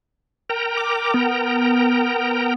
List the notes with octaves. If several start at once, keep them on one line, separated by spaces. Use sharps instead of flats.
A#4 G5 A#5
D6
B3